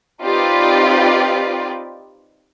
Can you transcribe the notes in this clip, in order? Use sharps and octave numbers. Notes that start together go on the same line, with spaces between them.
C4 D#4 F4 G4 B4 D5